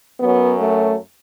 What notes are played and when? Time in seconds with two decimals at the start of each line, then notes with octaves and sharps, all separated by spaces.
0.19 F#2 F#3 B3
0.58 A3